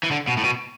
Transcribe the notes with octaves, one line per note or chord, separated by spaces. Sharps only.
E3
D3
B2
A2
B2